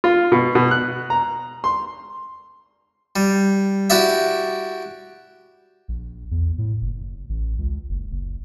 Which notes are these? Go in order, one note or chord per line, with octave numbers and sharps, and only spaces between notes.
F4
B2
B2
F#6
A#5
C6
G3
E4 F#4 G4 D5 E5
A#1
E2
A2
F#1
A1
C#2
F#1
F#1